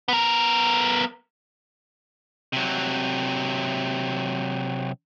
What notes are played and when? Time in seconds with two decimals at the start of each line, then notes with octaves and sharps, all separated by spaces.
0.08 B3 A#4
2.53 C3 F#3